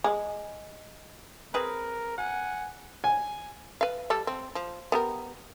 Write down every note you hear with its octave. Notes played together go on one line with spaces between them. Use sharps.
G#3
C4 G#4 A#4 B4
F#5 G#5
G#5
B4 F5
G3 A4
C4
F3
B3 G4 A#4